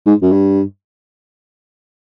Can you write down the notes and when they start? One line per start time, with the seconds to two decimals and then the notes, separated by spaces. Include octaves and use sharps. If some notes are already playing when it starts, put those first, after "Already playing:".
0.06 G#2
0.22 F#2
0.32 G2